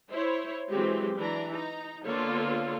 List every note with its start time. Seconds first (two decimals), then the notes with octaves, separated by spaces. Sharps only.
0.11 E4 C5 C#5
0.69 E3 F#3 G#3 C4 G4
1.15 E3 D4 A#5
1.51 D#4 A#5
2.06 D3 A#3 B3 F4 A4 C#5